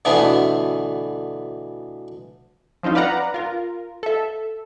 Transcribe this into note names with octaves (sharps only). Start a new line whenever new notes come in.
D2 B2 D3 E3 A3 B3
F3 C4 C#4 D#4 F4
B4 D5 F5 F#5 A#5
F4 A#4
A4 E5